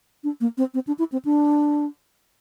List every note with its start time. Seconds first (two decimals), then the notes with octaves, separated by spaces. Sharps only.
0.24 D4
0.41 A#3
0.58 C4
0.74 C4
0.87 D4
0.99 E4
1.12 C4
1.25 D4